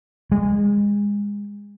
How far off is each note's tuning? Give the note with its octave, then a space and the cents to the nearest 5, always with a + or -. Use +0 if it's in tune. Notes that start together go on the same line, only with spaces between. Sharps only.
G#3 -25